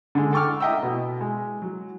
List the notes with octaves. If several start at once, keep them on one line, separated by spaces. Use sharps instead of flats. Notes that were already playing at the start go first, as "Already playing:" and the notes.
D3 G#3
A4 G5 C#6 D6 F6
D#5 E5 G5 A#5 E6
B2
G#3
F#3